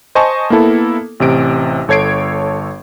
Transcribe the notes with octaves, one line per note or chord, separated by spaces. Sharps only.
C5 D#5 G#5 A5 C#6
A#3 B3 E4 A4
A1 C3 D7
G1 A4 C#5 G#6 C7 D7